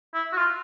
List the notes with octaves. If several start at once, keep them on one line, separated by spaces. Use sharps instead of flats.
E4
F#4
F4